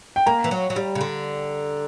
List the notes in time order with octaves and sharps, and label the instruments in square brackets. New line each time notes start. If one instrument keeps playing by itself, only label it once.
[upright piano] G5
[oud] A#3 [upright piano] A#5
[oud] E3
F#3
F#3
G3
C#3
D3